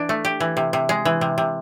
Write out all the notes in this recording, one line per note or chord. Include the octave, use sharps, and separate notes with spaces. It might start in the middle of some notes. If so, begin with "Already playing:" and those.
Already playing: E3 D4
A3
G4
E3
C3
C3
G#3
E3
C3
C3